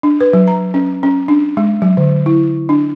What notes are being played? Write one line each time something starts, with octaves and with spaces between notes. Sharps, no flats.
D4
B4
F#3
A#5
C#4
C#4
D4
G#3
F#3
D3
E4
D4